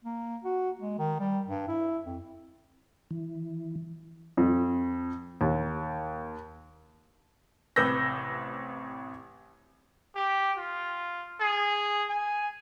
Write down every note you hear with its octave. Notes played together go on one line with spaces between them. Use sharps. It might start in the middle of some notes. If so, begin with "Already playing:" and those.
A#3
F#4
G#3
D#3
G3
G2
E4
F2
E3
F2
D#2
A1 C3 B4 E6 G6 A#6
G4
F4
G#4
G#5